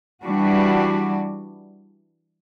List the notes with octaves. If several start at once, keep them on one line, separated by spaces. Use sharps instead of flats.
E3 G3 D4 F#4